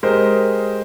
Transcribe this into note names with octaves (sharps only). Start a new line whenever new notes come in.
G#3 G4 A#4 C5 D#5